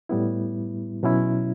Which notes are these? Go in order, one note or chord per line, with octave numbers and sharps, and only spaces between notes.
A2 G3 B3 E4
B2 F#3 C#4 E4